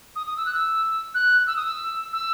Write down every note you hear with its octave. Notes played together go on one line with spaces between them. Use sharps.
D#6
D#6
E6
F#6
E6
F#6
E6
D#6
E6
E6